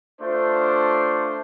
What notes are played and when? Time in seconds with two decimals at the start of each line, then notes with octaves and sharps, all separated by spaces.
0.21 A3 D4 F4 C5